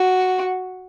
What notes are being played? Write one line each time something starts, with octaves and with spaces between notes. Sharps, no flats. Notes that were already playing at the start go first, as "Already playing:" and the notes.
Already playing: F#4